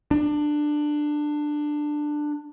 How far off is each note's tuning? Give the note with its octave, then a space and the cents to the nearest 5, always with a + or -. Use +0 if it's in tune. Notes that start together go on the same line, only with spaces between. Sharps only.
D4 +15